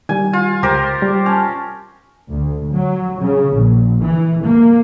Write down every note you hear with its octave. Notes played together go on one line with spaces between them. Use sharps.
D#3 G3 G#5
F4
C#2 G4 A#4 C5
G3
C#4 A5 F6
D2
F#3
C#3
A#1
E3
A#3